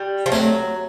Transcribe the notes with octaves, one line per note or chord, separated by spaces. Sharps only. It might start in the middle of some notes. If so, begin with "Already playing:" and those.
Already playing: G3
F3
F#3 A3 C4